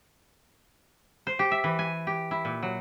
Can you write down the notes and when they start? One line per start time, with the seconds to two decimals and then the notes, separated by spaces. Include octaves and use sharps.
1.27 C5
1.39 G4
1.51 E5
1.64 E3
1.79 G#5
2.07 G4
2.31 E4
2.45 A#2
2.63 F#3